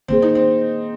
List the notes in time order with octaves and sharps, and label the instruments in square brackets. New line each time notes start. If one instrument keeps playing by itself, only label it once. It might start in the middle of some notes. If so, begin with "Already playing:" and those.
[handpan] D#3 A#3 G#4 [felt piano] C4
[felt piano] D#4
C4